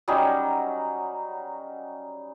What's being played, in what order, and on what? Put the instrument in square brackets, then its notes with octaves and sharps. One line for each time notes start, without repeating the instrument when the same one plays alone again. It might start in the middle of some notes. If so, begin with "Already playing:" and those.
[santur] F#3 G3 C#4 D#4